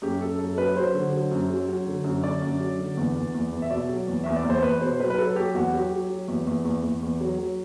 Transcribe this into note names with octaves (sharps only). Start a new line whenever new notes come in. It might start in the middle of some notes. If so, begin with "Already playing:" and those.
F#2 G4
F#2 A4
F#2 A4
A4
F#3 B4
F#3 C5
D3
F#3
F#2
F#3
F#3
D3
F#2
D3 D5
F#2
F#3
D3
E2
E2
E2
E2
E5
B2 D5
F#3
E2
E2 E5
D5
E2
C5
E2 B4
B2 C5
C5
F#3 B4
B4
F#3 A4
F#3 G4
E2 F#4
F#3 G4
F#3
F#3
E2
E2
E2
E2
E2
F#3
F#3